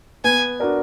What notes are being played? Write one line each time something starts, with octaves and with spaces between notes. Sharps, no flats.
B3 G#5
D4 F#4 A#4 D5